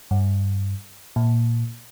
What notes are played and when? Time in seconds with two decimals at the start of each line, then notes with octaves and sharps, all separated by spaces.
0.11 G2
1.16 A#2